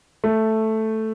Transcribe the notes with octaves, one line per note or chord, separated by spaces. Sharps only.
A3